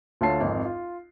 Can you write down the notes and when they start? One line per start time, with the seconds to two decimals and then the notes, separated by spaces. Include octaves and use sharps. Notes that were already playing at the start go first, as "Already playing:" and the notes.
0.21 D2 D3 F4 C#5 A5 C7
0.40 G#1 F2
0.65 F4